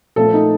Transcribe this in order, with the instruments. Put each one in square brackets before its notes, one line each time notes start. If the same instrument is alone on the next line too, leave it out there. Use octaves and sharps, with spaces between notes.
[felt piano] A#2 F3 A3 C#4 A4
D#4